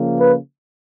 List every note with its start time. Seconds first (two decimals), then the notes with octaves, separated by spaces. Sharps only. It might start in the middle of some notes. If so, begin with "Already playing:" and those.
Already playing: C#3 F3 A#3
0.20 B4